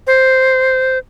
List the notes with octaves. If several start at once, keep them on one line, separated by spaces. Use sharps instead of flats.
C5